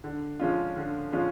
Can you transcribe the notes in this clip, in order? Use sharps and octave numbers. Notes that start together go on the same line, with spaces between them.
D3
F3 G#3 C#4 F4
D3
F3 G#3 C#4 F4